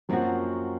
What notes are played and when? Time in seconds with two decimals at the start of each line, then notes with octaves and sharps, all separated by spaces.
0.09 F#2 F3 F#3 A#3 C4 F#4